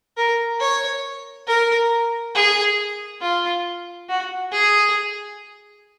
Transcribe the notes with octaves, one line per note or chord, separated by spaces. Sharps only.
A#4
C#5
A#4
G#4
F4
F#4
G#4